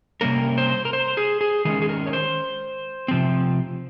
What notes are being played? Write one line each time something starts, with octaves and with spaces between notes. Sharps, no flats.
C3 G3 A#3 C#4 A#4
C5
A#4
C5
G#4
G#4
D#3 G#3 C#4 G#4
G#4
A#4
C#5
C5
C3 F3 C4